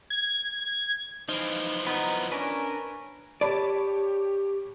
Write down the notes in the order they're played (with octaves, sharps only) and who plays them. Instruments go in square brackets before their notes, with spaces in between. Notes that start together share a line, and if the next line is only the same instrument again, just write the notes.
[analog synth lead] G#6
[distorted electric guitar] E3 F3 [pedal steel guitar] D#4
[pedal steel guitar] B3 B4 [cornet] D#4
[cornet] C#4 [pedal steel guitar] D4 A#4 B4
[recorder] G4 [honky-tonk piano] C#5 A5 B5 [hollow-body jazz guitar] D5